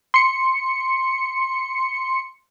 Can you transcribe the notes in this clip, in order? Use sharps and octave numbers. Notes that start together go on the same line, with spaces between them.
C6 C#7